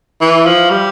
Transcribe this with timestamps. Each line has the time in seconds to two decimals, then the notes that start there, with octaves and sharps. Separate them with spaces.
0.21 E3
0.46 F3
0.70 G3